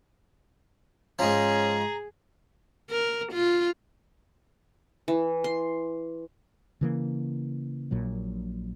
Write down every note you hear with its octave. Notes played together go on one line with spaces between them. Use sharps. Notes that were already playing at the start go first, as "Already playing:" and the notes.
G#2 F3 C#4 G#4 A#5
A#4
F4
E3
C6
C#3 E3 A#3
A#1 A#2 F#3